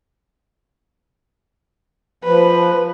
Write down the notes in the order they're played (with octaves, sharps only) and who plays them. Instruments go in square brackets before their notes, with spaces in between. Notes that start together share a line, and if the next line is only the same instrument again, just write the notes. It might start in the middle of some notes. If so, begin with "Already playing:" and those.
[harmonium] F3 [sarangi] B4